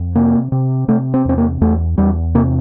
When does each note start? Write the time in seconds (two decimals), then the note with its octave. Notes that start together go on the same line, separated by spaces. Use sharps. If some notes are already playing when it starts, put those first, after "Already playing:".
Already playing: F2
0.15 C3 A#3
0.52 C3
0.88 C3 A3
1.14 C4
1.25 E2 C4
1.38 A#3
1.61 E2 A3
1.98 E2 G3
2.35 C3 A#3